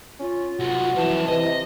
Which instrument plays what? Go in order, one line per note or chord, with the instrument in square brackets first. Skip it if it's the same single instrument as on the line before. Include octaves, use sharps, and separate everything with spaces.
[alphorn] C#4 [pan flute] F4
[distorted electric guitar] C3 F#3 [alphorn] F#4
[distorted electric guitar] F#2 F3 [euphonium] E3 [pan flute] A5
[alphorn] C3 [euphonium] E3 [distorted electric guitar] D#5